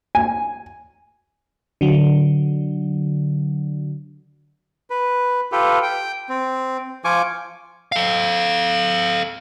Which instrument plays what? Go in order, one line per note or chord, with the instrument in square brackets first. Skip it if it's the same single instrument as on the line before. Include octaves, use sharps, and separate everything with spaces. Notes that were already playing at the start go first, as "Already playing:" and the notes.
[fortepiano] G#5
[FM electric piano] D3 F#3
[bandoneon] B4
F4 G4 A4 B4
G5
C4
F3 F4 G#5 C#6 D6
[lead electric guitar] A4 F5